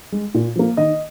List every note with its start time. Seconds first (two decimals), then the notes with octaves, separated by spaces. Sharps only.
0.12 G#3
0.34 A#2
0.56 F3 A#3
0.77 D#3 D#5